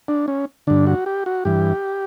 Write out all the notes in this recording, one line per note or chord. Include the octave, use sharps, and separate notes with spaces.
D4
C#4
G2 D3 D4
F#4
G4
F#4
G2 E3 G4